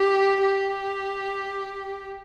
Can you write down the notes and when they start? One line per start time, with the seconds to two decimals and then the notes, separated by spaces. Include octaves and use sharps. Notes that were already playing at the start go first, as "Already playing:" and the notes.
Already playing: G4
0.42 G4